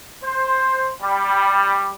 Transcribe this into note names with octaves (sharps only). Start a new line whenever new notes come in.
C5
G3